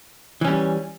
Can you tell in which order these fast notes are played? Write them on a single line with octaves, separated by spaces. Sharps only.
E3 C#4 G3